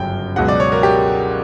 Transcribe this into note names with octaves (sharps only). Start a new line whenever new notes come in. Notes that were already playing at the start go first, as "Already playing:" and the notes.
Already playing: G1 F#2 C#3 F#3 G5
C#2 B2 F#3 F#5
D5
C#5
A#4
G4